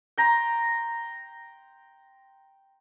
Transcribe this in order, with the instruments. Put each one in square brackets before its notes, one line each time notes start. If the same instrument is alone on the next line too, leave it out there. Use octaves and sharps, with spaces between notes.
[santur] G5 A#5 C6